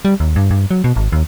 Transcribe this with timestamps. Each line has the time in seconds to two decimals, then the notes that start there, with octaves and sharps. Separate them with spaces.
0.05 G3
0.20 D#2
0.36 G2
0.51 G2
0.71 F#3
0.84 B2
0.96 G#1
1.12 D#2